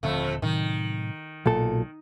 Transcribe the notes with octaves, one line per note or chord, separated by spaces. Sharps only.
D#1 F2 D3 A3 C4
A2 C3 D#3 F#3
B1 A#2 F#3 A4